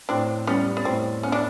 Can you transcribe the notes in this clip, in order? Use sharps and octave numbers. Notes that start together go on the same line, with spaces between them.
A2 C4 D4
G3 B3 C#4
B3
A2 C4
B3 C#4
D4